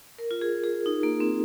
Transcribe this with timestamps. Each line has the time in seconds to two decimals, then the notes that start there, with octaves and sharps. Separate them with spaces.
0.19 A#4
0.31 F4
0.41 G#4
0.64 G#4
0.86 D#4
1.03 A#3
1.20 C4